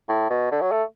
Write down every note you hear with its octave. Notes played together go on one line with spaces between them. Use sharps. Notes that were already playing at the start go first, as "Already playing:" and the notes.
A2
B2
D3
F#3
A3